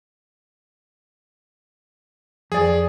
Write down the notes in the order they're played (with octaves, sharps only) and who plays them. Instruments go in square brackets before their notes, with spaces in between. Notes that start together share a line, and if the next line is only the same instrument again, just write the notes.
[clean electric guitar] F2 D5 [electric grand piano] G#4